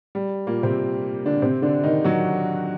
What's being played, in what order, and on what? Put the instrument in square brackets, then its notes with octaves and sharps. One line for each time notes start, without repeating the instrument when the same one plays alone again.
[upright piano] G3
A#2 A#3
C3 C4
D3 D4
C3 C4
D3 D4
D#3 D#4
F#3 F#4